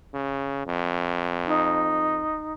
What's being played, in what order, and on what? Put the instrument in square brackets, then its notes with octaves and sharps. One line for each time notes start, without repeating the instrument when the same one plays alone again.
[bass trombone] C#3
F2
[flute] D#4